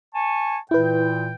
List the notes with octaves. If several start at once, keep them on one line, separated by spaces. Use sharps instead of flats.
G#5 A5 C#6
A#2 E3 E4 B4 G5